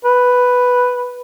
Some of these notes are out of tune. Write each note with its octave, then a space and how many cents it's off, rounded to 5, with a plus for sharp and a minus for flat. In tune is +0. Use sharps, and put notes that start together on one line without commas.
B4 +0